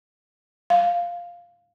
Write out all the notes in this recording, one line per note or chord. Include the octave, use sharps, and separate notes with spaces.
F5